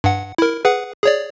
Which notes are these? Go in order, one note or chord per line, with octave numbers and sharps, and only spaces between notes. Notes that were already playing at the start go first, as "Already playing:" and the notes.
G2 F#5
E4 A#4
G#4 B4 F#5
G#4 C#5 D5